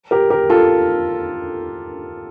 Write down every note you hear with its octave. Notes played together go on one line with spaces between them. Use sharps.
G4 A#4
G4 A#4
F4 A4